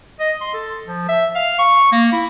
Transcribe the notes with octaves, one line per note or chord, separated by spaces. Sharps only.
D#5
C6
A4
F3
E5
F5
C#6
A#3
E4